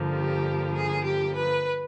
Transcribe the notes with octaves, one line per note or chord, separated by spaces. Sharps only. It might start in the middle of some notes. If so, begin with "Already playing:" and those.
Already playing: G2 D3 F3 A#3
G4
G#4
G4
B4